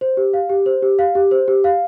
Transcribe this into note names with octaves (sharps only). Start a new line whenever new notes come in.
C5
G4
F5
G4
C5
G4
F5
G4
C5
G4
F5